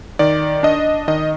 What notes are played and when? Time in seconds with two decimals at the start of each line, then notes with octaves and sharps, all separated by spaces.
0.19 D#3 D5
0.63 D4 D#5
1.08 D#3 D#5